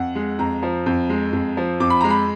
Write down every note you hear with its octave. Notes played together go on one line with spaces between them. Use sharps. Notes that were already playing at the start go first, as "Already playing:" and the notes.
Already playing: F2 F#5
G#3
F2 A#5
F3
F2
G#3
F2
F3
F2 D6
B5
G#3 A#5
B5